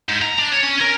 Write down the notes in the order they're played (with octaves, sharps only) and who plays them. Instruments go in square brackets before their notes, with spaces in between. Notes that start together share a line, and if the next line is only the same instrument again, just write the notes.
[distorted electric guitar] G#2
A#5
D4
C#5
C#4
A#4